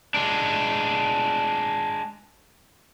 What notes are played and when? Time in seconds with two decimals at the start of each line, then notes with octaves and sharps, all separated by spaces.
0.14 G#3 D4